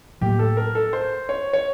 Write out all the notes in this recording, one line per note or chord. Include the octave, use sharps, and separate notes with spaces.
A2 F#3 A#3 G4
A4
A#4
A4
C5
C#5
C#5